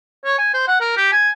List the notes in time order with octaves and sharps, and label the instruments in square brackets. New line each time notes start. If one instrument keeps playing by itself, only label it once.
[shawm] C#5
G#5
C5
F#5
A#4
G4
G#5